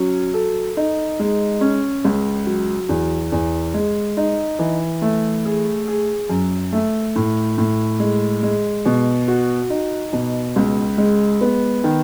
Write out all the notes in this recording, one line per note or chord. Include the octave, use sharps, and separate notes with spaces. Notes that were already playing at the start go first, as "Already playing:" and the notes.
Already playing: F#3 C#4
A4
D#4
G#3
C#4
C#2
F#3
E2
E2
G#3
D#4
E3
A3
G#4
G#4
F#2
A3
A2
A2
G#3
G#3
B2
F#4
D#4
B2
C#2
G#3
B3
D#3